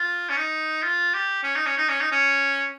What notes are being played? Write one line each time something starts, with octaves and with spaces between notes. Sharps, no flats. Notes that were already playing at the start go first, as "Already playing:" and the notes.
Already playing: F4
C#4
D#4
F4
G4
C#4
D#4
C#4
D#4
C#4
D#4
C#4